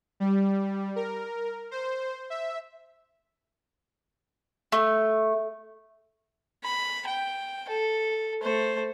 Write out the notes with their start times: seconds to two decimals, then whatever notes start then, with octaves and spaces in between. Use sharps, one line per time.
0.20 G3
0.96 A#4
1.71 C5
2.30 E5
4.72 A3
6.64 B5
7.08 G5
7.69 A4
8.43 A3 C5